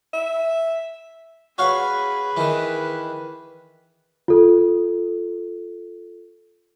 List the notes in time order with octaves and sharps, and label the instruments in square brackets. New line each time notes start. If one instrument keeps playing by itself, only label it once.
[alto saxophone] E5
[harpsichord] F#4 C#5 F5 [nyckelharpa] G#4 B4
[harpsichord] D#3 E3
[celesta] F4 A4